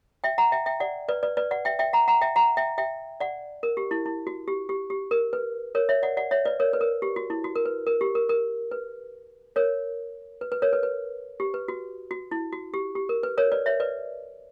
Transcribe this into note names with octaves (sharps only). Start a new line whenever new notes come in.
E5 G5
F#5 A#5
E5 G5
E5 G5
D5 F#5
B4 D5
B4 D5
B4 D5
D5 F#5
E5 G5
E5 G5
F#5 A#5
F#5 A#5
E5 G5
F#5 A#5
E5 G5
E5 G5
D5 F#5
A#4
G4
E4
E4
F#4
G4
G4
G4
A#4
B4
A#4 C#5
C#5 E5
D5 F#5
D5 F#5
C#5 E5
B4 D5
A#4 C#5
B4
A#4
G4
F#4
E4
F#4
A#4
B4
A#4
G4
A#4
A#4
B4
A#4 C#5
B4
B4
A#4 C#5
B4
B4
G4
B4
F#4
F#4
E4
F#4
G4
G4
A#4
B4
A#4 C#5
B4 D5
C#5 E5
B4 D5